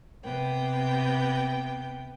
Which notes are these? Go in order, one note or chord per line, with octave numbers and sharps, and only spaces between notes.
C3 B3 G5